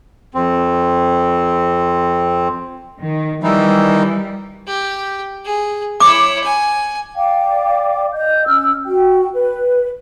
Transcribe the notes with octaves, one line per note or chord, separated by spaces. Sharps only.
F2 C4
D#3
D#3 E3 G3 D#4
G4
G#4
E4 C#5 D6
G#5
D5 F5 G5 D6
D#5 G6
C#4 E6 F6
F#4 G5
B4